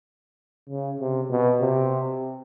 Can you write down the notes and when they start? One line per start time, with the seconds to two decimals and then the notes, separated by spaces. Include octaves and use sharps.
0.69 C#3
1.00 C3
1.30 B2
1.61 C3